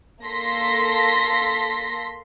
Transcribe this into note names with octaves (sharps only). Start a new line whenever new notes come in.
A#3 A4 C6 A#6 B6